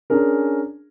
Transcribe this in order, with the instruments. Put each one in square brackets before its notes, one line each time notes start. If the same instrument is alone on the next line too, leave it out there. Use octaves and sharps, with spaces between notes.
[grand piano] C#4 D4 G#4 A#4